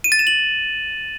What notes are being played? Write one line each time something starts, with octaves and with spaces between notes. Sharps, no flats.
D#7
A6
E7
F#7